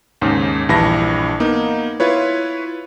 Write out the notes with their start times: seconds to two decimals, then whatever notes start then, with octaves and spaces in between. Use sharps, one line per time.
0.22 D#2 G#2 C#3
0.69 A#1 G2 E3 A5 B5 A#6
1.40 A#3 B3 D#4
2.00 E4 F4 B4 C#5